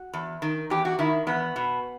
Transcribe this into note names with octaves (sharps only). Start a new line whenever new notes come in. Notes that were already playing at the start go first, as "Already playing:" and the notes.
Already playing: F#4
E2
D#3
E2 G4
F#4
D#3 E4
E2 B3
B2